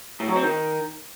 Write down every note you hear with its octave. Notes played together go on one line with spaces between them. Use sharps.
A2
F#3
C4
D#3